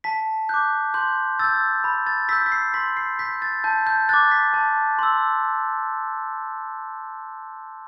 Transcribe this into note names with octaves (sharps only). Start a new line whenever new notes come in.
A5 B6
D6 F#6 G6
C6 G6
E6 G6 A6
B5
A6
E6 G6 B6
B6
C7
C6 B6
C7
G6 B6
A6
A5 G6
G6
D6 F#6 A6
B6
A5
C6 E6